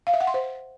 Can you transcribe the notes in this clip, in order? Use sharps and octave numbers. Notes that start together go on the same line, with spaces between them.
F5
E5
F#5
C6
C5